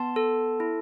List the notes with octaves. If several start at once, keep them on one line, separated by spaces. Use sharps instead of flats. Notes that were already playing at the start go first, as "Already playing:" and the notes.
Already playing: B3 A5 C6
A4
E4